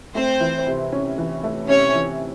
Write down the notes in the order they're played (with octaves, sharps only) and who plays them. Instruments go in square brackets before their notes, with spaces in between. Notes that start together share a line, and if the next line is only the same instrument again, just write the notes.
[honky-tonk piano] A3 [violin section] C4 C5
[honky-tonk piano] E3
C3
C#4
E3
A3
[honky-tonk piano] C3 [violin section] C#4 C#5
[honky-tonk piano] E3